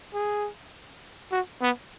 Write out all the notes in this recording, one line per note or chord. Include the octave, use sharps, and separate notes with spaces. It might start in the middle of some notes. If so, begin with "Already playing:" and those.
G#4
F#4
B3